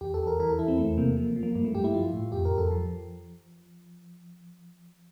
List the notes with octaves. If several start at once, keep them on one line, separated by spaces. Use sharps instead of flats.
E2 G4
A4
E2
A#4
E3 A#4
A4
E3 E4
C4
E2 A3
C3 A#3
F3 A#3
F3
A#3
G2 A#3
A3
G2 G4
E4
F3 F4
A2
F2 G4
A#4
F2
A4
F3